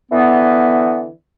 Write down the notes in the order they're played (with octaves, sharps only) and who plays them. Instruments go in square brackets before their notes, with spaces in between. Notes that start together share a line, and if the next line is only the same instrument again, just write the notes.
[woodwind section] D3 E3 B3